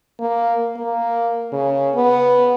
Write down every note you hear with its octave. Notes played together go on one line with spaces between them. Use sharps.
A#3
A#3
C#3
B3